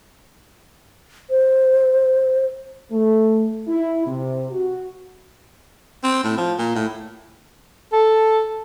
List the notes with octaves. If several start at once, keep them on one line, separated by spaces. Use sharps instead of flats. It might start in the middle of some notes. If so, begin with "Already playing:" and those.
C5
A3
E4
C3
F#4
C4
A2
F3
A#2
A2
A4